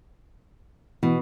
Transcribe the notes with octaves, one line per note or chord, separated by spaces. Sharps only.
B2 E3